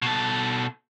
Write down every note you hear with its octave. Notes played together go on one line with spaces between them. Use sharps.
B2 A4